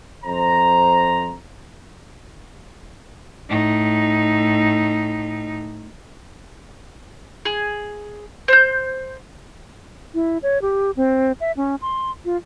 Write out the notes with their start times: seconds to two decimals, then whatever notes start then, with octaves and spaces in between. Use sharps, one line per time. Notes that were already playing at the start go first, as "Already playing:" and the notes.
0.24 F2 C5 A#5
3.49 A2 D#4
7.45 G#4
8.48 C5 G6
10.14 E4
10.43 C#5
10.62 G4
10.97 C4
11.40 E5
11.57 C#4
11.82 C6
12.25 F4